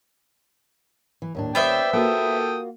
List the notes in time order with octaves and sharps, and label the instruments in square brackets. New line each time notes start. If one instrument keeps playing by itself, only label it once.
[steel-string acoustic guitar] E3
D#2 A2 D4
[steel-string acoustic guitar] D#2 C#4 [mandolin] B3 C5 E5 [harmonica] D5 G5
[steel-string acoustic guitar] A#3 F4 F#4 [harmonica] A4 G5 D#6